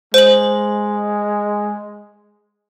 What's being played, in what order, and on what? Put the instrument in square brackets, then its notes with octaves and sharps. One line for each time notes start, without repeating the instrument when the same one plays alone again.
[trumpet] G#3 [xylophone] C5 F#7